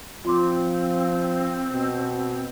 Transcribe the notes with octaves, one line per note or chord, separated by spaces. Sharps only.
F3 C4 F4 C6 D6
B2